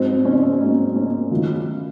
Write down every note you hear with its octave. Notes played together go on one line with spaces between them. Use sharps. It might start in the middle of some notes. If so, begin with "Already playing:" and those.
Already playing: G#2 F#3 C4
C#4
C4
C#4
G#2 F#3 A#3
C#4
F#2 D#3 F#3 F4